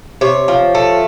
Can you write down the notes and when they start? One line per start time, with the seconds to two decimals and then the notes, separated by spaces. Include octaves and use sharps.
0.21 C3 C#5
0.48 F3
0.75 A3